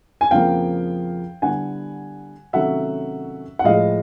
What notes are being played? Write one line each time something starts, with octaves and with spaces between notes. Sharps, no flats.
G#5
F2 C#3 F3 A#3 F5 G5
D3 G3 B3 E4 F#5 G#5
C3 D#3 F#3 A3 C#4 E5 F#5
F#5
A2 F3 G#3 D#5 F5